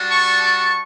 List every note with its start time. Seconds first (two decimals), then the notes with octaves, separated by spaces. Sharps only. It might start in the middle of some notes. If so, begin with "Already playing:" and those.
Already playing: G3 D4 F#4
0.09 A5 C#6
0.40 A5 C#6